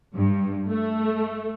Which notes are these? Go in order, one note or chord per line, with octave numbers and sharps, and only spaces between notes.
G2
A3